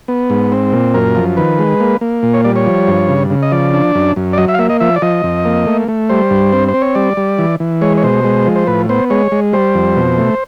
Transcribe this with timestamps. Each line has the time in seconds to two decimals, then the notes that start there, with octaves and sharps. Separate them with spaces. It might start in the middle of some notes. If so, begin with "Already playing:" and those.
0.08 B3
0.30 G#2
0.52 C4
0.73 A#2
0.94 F#2 A#4
1.15 F3
1.37 D#3 B4
1.59 G#3
1.80 A#3
2.01 A#3
2.23 A#2
2.34 C#5
2.44 G3 D5
2.56 C#5
2.66 F3
2.88 G2
3.09 C#3
3.30 C#3
3.43 D#5
3.52 F3 D5
3.73 D4
3.95 F#2
4.16 F#2
4.33 D5
4.38 F#3 D#5
4.48 E5
4.54 F5
4.59 A#3 E5
4.70 D#5
4.80 F3 E5
4.96 D5
5.02 F3 D#5
5.24 F2
5.45 A#3
5.67 A3
5.88 A3
6.09 G3 C5
6.31 G2
6.53 C4
6.68 C5
6.74 C4
6.82 C#5
6.95 G3 D5
7.17 G3
7.38 E3
7.60 E3
7.81 G#3 C#5
7.97 C#5
8.03 B2 C5
8.24 G#3
8.46 F3
8.56 C5
8.67 A2 B4
8.89 B3 C5
9.10 G#3 C#5
9.32 G#3
9.53 G3 C5
9.75 F2
9.96 B2
10.18 A3